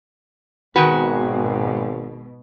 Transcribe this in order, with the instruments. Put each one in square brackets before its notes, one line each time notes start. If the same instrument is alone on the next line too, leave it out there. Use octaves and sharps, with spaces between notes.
[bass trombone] G#1 [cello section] G#2 B2 [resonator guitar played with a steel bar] D#3 G#3 F#4 [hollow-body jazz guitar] B4